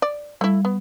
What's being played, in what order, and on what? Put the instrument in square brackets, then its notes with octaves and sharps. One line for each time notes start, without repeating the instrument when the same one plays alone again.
[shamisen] D5
[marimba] G3 [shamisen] A3 E4
[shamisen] B3